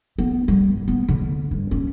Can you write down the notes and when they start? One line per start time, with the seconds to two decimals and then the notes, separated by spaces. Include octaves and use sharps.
0.19 B3
0.48 G3
0.71 G2
0.88 B3
1.08 D3
1.51 G2
1.71 C#4